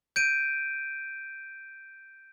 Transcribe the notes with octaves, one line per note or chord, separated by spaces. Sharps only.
G6 D7 D#7